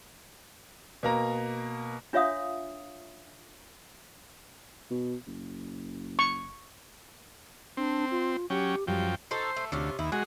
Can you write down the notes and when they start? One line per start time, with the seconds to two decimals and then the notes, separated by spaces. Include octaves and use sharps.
1.03 B2 A#3 A#5
2.13 D4 F4 C#5 E5 F5 D#6
4.91 B2
5.27 F#1
6.19 C#6
7.77 C4 D4
8.11 F4
8.50 F#3 C#4 G4 G5
8.87 F#2 F3 G3 G5
9.31 D#4 F#4 A4 C5
9.56 A3
9.72 D2 C3 C#4 F4
9.99 D#2 E4
10.12 G#3 F#4 G#4